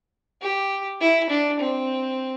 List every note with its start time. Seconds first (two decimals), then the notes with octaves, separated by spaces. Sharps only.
0.42 G4
1.01 E4
1.30 D4
1.60 C4